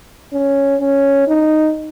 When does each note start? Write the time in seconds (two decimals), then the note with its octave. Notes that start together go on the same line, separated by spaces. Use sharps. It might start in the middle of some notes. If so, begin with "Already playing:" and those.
0.33 C#4
0.81 C#4
1.28 D#4